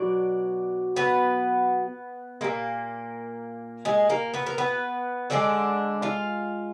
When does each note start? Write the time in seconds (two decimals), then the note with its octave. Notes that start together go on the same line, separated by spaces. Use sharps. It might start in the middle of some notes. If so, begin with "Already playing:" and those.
Already playing: B2 F#3 D4 D5
0.96 B3 B4
2.41 A#2 G#3 A#3 A#4
3.85 G#3 G#4
4.10 A#3 A#4
4.34 B3 B4
4.46 A#4
4.58 B3 B4
5.30 D3 F3 G#3 D4 D5
6.02 F4 F5